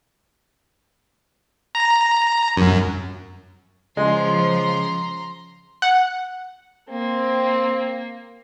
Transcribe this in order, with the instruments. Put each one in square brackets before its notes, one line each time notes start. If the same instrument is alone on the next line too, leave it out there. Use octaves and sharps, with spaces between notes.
[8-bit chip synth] A#5
F#2
[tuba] C#3 [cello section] F3 [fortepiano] G#3 [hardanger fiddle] A#5 C6
[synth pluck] F#5
[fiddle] A#3 [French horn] C4